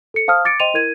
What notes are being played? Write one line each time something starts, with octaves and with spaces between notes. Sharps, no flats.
A4 C#7
C5 F5 A5 D#6 F6
D6 A6 C#7 D7
C5 D#5 G5 C6 D#7 F7
E4 A#4 G#6 D#7